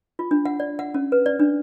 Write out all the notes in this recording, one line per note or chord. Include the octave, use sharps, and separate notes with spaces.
F4
D4
F#5
D5
F#5
C#4
B4
D5
D4